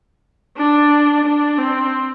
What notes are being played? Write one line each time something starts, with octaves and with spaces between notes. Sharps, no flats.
D4
D4
C4